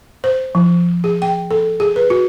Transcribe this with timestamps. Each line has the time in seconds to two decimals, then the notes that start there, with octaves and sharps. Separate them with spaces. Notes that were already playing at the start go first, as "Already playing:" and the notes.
0.24 C5
0.55 F3
1.04 G#4
1.22 G5
1.51 A4
1.80 G#4
1.96 B4
2.10 F#4